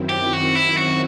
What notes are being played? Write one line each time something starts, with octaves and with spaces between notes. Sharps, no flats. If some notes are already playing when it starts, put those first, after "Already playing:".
Already playing: F#2 D#3 F#3 C4 E4
G4
F#4
E4
F#4